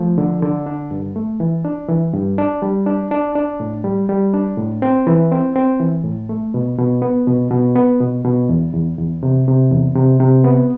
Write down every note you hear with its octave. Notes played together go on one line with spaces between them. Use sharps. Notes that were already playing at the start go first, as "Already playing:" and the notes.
Already playing: F3 A3
D3
D3
D4
G2
A3
E3
D4
E3
G2
D4
G3
D4
D4
D4
A2
G3
G3
D4
A2
C4
E3
C4
C4
E3
A2
A3
B2
B2
B3
B2
B2
B3
B2
B2
E2
E2
E2
C3
C3
E2
C3
C3
B3